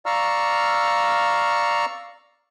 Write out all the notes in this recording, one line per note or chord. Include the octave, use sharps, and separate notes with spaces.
D5 F5 A#5 C#6 E6 F6